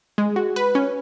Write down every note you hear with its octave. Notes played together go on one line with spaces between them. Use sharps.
G#3
F#4
B4
C#4